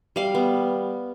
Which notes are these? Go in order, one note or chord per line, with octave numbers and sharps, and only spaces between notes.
G3 F5
B3